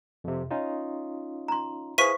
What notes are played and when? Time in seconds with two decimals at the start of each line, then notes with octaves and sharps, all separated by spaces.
0.24 F2 C3
0.51 C#4 D#4 F4
1.48 A#5 C6
1.98 E4 G#4 B4 C5 F5 C#6 B6 D#7